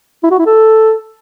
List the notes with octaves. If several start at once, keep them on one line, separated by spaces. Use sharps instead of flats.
E4
F#4
E4
A4